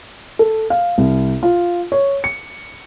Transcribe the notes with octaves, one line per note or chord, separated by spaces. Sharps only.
A4
F5
C2
F4
C#5
C#7